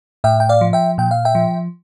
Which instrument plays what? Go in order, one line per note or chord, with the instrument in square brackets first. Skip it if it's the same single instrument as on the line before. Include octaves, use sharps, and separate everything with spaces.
[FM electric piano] A2 E5 G5
G5
D5 F5
F3
E5 G5
A#2 G5
F5
E5 G5
F3